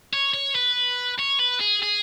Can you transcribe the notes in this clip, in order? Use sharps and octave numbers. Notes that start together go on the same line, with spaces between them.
C#5
C#5
B4
C#5
B4
G#4
G#4